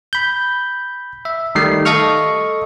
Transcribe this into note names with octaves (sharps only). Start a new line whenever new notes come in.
B5 G6
E5
D#3 G3 A3 C7
A4 D#5 F5 C#6 F6